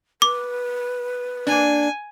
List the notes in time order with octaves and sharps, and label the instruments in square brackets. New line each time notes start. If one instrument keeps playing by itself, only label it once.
[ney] B4 [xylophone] D6
[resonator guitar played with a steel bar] A#3 D4 [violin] G#5